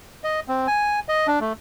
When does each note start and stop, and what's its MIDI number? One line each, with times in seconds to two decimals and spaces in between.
0.24 0.40 75
0.48 0.67 60
0.67 1.00 80
1.08 1.27 75
1.27 1.39 62
1.41 1.53 57